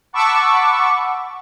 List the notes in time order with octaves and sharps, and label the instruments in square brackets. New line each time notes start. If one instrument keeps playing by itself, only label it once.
[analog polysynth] F#5 A5 B5 C#6 D6 E6